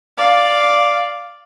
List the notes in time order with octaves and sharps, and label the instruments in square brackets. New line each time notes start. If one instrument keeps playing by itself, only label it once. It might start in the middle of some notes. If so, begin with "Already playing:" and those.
[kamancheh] D5 F5